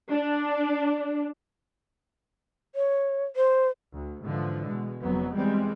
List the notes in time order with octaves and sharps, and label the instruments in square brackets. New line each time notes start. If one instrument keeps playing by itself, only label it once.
[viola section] D4
[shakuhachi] C#5
C5
[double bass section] D2
G#2 D3 E3 F3
B2 G#3
F#1 F2 F#3 B3
E2 G3 G#3 C4